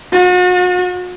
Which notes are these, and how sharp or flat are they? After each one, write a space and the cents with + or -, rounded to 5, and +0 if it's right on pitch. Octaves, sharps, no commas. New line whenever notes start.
F#4 -40